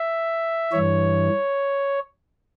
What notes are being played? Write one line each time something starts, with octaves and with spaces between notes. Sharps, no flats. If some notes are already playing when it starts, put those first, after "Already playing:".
Already playing: E5
G2 E3 C#5